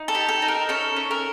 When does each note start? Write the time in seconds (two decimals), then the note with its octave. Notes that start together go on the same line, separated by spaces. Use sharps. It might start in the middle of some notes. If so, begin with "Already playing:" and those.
Already playing: D#4
0.08 A4
0.15 G4
0.29 A4
0.42 D#4
0.48 A#4
0.69 C#4 A4
0.96 C#4
1.11 A#4